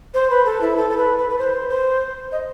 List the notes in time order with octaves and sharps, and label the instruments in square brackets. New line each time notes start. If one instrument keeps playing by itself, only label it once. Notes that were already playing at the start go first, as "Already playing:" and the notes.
[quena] C5
B4
A4
E4
A4
A4
B4
B4
B4
C5
C5
D#5